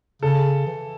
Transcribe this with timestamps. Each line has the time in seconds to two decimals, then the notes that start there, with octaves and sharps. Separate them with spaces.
0.22 C#3 A4
0.66 E3